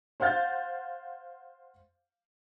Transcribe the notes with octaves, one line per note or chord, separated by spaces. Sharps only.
C5 F5 F#5 G6 A6